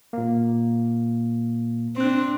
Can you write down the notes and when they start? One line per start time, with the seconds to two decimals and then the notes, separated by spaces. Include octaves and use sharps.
0.13 A#2 A#3
1.96 C4 D4 C6 F#6